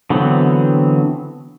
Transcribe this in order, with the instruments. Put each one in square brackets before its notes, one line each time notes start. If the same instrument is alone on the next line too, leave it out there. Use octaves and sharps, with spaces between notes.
[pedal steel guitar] D3 E3 F#3 B3 C4